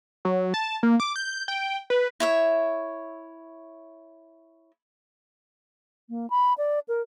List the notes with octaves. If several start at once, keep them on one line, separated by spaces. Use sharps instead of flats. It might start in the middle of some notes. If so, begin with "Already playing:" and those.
F#3
A5
A#3
D6
G6
G5
B4
E4 C#5 E5
A#3
B5
D5
A#4